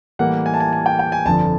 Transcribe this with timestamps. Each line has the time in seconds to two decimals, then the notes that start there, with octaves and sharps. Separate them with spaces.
0.19 A2 E3 G3 A#3 F#5
0.46 G#5
0.54 A5
0.60 G#5
0.73 G#5
0.86 G5
0.99 G5
1.12 G#5
1.25 G1 F2 D3 F3 A5